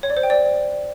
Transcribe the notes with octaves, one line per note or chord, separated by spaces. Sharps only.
C#5
D5
C5
G5
D5